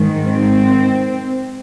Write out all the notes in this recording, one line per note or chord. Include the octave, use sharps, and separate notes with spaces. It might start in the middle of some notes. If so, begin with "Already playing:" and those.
Already playing: G#2 D#3
C4